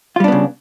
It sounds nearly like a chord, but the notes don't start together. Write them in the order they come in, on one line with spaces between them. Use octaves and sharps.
F4 G3 D4 B3 C#3